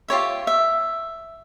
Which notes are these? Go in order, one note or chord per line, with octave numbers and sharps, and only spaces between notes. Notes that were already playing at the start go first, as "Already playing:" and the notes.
F4 G4 C#5 E5
E5